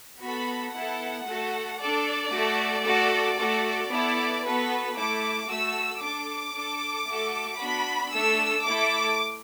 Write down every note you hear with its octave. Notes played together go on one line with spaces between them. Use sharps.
B3 F#4 A4 B5
B3 E4 A4 F#5
A3 F#4 A4
D4 A4 D5
A3 F#4 A4
A3 F#4 A4
A3 F#4 A4
B3 E4 A4 D5
B3 F#4 A4 B4
A3 E4 A4 D6
A3 F#4 A4 E6
D4 A4 D6
D4 A4
A3 F#4 A4
B3 D4 F#4 B5
A3 D4 A4 E6
A3 E4 A4 D6